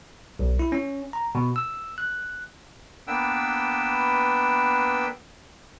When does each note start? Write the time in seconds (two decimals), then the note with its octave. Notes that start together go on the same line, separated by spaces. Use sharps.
0.39 B1
0.59 E4
0.72 C#4
1.13 A#5
1.35 B2
1.56 E6
1.98 F#6
3.07 A#3 B3 D4 B4 G5 E6